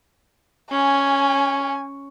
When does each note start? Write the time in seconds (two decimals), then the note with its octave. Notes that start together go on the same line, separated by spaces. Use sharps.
0.72 C#4 G#5